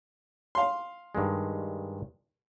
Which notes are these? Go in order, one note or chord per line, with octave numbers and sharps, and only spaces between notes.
F5 C6
G2 D#3 G#3